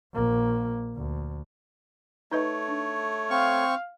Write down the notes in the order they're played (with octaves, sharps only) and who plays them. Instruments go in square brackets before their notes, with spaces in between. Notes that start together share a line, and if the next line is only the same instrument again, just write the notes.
[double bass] A#1 A#3
D2
[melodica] A3 C#5 [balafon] D#4 B4 D#5
[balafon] D4
[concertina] C4 C#6 [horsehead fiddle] F5